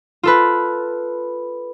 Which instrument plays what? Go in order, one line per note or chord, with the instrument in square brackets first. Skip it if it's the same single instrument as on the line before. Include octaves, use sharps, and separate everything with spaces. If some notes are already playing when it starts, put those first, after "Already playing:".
[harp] F4 A4 B4